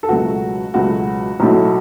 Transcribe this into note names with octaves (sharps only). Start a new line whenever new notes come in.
A4
C#2 B2 F#3 A3 F#4
C#2 B2 F#3 A3 F#4
B1 A2 F#3 A3